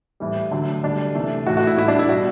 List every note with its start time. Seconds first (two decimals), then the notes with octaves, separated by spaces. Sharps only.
0.20 A2 E3 G3
0.51 D3 F#3 A3
0.83 D3 G3 D4
1.15 C3 E3 A3
1.46 A2 E3 A3 F#4
1.57 F#4
1.67 E4
1.77 A2 G3 E4
1.88 D4
1.99 E4
2.09 B2 G3 F#4